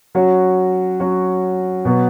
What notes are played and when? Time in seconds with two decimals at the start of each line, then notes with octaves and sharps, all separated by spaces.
0.15 F#3 C#4 F#4
1.00 F#3 C#4 F#4
1.85 B2 F#3 B3